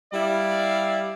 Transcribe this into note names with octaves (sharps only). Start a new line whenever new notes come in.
G3 E4 D5 F5